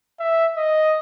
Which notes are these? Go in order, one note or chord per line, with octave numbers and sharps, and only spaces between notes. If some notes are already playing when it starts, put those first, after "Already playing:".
E5
D#5